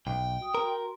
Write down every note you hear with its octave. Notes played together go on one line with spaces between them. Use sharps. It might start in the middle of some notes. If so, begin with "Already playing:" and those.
B1 G5
F#4 D#6
F#4 A#4 C6